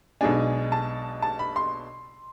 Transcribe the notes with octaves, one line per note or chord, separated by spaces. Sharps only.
B1 B2 G#3 D4 G#5
A5
A5
B5
C6